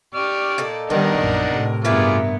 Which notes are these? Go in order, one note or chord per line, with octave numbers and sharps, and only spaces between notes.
G4 D5 C#6 F6
A#2 D#4 A4
D#3 G3 B3 D4 D#4 A#4 F#5
A#1 F#2
A2 C3
G2 B3 E4 F4 G#4 A#4 B4 D6